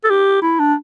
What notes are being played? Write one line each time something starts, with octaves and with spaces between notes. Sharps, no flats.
A4
G4
E4
D4